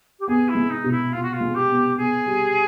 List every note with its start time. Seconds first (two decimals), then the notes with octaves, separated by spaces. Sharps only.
0.19 G4
0.27 B3 G#4
0.48 E4
0.55 G#3
0.70 D#4
0.84 B2
0.91 E4
1.12 B3 F4
1.23 F#4
1.33 F4
1.40 G#3
1.55 G4
1.69 B3
1.97 B3 G#4
2.26 G3